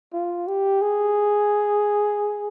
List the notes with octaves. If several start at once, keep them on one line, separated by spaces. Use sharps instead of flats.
F4
G4
G#4